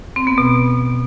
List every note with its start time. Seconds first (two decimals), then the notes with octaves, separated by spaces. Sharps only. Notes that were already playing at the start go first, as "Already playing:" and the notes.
0.16 C4
0.27 B3
0.38 B2